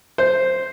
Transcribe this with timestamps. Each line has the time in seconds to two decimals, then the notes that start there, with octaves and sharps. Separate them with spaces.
0.18 C5